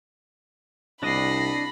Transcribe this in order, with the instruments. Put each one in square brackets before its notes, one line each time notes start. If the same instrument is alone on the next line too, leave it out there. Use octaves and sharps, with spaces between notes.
[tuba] C2 [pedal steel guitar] D4 D5 D#5 [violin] B5 [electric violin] A#6 C7